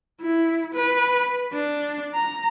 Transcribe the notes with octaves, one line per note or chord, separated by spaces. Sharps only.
E4
B4
D4
A#5